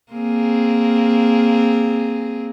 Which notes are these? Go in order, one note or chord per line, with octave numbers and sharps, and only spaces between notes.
A#3 C4 G#4